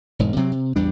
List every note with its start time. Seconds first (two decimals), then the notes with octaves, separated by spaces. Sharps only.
0.19 E1 G#2
0.36 C3 F#3 C4
0.52 C3
0.76 A1 E2 G3 D4